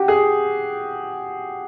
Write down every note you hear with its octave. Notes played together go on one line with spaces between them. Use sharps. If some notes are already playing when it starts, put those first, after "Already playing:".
Already playing: F#4 G4
G#4